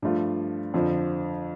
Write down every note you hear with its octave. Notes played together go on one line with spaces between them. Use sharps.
G2 F3 A3 F4
F2 D3 F3